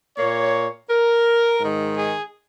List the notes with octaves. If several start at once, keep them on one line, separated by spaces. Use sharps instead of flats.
A#2 A#3 C#5
A#4
G#2 D#3 G#3
G#4